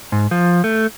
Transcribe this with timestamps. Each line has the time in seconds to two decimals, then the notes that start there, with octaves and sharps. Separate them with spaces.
0.12 G#2
0.31 F3
0.64 A3